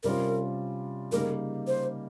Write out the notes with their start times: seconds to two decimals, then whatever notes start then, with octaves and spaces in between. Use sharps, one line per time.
0.04 C3 G3 C#4 F4 A#4
1.12 C#3 G3 A#3 D#4 A#4
1.67 C5